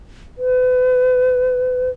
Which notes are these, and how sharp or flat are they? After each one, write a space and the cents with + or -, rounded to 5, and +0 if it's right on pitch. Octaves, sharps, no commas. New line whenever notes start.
B4 +35